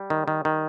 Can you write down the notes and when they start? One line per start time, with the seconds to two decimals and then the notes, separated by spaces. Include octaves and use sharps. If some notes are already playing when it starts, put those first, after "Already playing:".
Already playing: G3
0.10 D#3
0.28 D#3
0.45 D#3